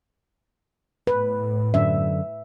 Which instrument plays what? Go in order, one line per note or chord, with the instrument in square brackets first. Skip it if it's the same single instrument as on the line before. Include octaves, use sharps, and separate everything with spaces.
[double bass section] A2 [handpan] B4
[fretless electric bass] F#2 D3 D4 [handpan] E5